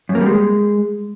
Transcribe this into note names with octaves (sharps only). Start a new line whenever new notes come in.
F#2
A#3
G3
G#3